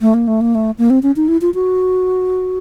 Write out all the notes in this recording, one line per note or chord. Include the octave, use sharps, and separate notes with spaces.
A3
A#3
A3
A#3
A3
A#3
C4
C#4
D#4
E4
F4
F#4